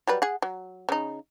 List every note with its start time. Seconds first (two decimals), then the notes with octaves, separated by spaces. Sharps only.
0.07 F#3 G3 B4
0.22 G#4 F#5
0.42 F#3
0.89 C#3 D#4